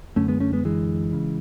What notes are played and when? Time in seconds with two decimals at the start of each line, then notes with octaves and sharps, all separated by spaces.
0.16 F#2 D3 A3 C#4
0.28 G#3 B3
0.40 A3 C#4
0.53 G#3 B3
0.65 E3 G#3
1.13 C#3